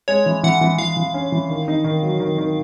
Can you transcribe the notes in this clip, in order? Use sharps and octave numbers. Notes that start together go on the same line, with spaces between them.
G#3 C#5
E3
E3 F#5
E3
E3 F5
E3
C#4
E3
D#3
D#4
D#3
F#3
D#3
D#3